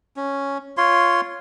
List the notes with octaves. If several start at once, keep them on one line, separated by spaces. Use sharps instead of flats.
C#4
F4 C#5 C6